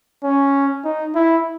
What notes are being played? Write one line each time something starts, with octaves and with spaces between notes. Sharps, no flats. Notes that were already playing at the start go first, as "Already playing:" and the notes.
C#4
D#4
E4